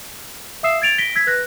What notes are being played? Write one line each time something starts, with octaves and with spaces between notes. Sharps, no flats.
E5 F5 D#6 E6 C7 E7
G#6 A6 D7 F7
A#6 B6 D7 G7
E6 G#6 B6
B4 F#6 A#6